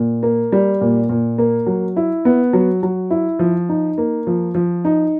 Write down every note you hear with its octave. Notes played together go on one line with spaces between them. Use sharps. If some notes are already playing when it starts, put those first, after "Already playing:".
Already playing: A#2
A#3
G3
A#2
A#2
A#3
F#3
E4
B3
F#3
F#3
E4
F3
D#4
A#3
F3
F3
D#4